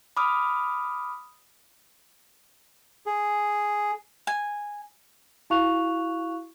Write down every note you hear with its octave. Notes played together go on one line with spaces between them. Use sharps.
B5 D6 D#6 F6
G#4
G#5
E4 F#4 F5 C#6 F#6 F7